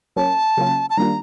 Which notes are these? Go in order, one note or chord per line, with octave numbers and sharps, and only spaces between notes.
F#3 A#3 C#4 A5
C#3 F#3 A#3 C#4 F4
A5
D#3 G3 A#3 D4 F4 A#5